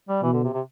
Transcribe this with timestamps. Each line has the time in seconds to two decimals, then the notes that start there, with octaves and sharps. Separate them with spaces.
0.09 G3
0.22 B2 E3
0.33 D3
0.44 C3
0.54 C3